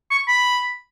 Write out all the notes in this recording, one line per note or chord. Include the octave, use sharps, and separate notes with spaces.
C#6
B5